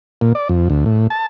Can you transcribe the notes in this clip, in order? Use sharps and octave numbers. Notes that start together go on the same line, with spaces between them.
A#2
D5
F2
D2
A2
A5